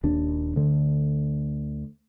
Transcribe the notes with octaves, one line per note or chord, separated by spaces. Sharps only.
D#1 D#2 D4
D2 D3